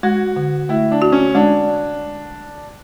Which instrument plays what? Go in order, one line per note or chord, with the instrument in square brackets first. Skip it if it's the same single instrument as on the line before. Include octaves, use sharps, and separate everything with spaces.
[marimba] G#3 [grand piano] F#4
[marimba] D3
[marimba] A3 [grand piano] E4
[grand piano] D4
[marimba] F#4
[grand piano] C#4
[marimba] G#3 [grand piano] D4